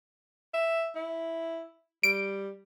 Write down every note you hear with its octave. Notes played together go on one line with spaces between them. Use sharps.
E5
E4
G3 D7